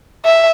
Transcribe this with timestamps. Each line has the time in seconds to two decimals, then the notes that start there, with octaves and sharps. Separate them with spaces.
0.25 E5